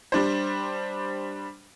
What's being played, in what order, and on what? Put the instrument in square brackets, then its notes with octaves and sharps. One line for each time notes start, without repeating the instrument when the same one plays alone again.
[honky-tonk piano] G3 D4 C5